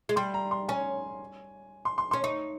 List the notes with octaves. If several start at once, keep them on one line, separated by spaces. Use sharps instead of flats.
G#3
G3 C6
A#5
C6
C#4 G#5
C6
C6
C#4 C6
D#4 C#6